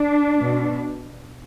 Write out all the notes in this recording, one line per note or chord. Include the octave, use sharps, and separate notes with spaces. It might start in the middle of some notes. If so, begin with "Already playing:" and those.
Already playing: D4
B2